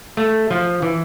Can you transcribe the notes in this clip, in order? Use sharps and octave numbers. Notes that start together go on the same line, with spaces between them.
A3
F3
E3